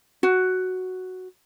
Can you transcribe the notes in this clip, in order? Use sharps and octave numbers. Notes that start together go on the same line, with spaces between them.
F#4